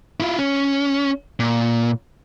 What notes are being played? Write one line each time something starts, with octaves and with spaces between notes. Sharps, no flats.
E4 F4
C#4
A#2